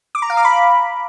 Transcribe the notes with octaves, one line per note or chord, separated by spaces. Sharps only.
D6
A#5
F5
D6
B5